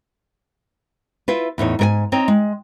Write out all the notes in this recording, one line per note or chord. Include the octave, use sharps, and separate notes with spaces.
E4 F4 B4
E2 A2 D#4 C#5
G#2 A#4 G#5
C4 D#4 C#5
G#3